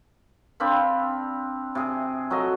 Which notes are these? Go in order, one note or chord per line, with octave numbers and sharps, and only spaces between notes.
C4 D4 F5 B5
C3 G#4
F#3 F#4 A4 D#5